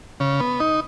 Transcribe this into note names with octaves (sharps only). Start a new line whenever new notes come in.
C#3
B3
D#4